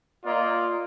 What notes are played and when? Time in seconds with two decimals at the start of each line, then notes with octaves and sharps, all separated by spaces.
0.24 A#3 F4 D5 D#5